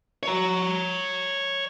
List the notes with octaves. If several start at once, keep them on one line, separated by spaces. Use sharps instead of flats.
C#5 A#5